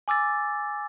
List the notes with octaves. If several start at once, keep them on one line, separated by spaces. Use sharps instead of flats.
G#5 D6 E6 A6